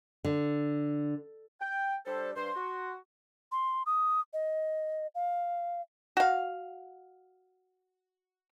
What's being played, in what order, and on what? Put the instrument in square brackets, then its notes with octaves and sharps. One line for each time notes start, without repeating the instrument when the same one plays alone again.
[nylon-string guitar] D3
[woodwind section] G5
[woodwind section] G3 D4 A4 [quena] C5
[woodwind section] G2 C5 [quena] C6
[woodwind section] F#4
[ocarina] C6
D#6
D#5
F5
[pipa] F#4 F5